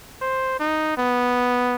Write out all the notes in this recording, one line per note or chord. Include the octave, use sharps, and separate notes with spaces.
C5
D#4
B3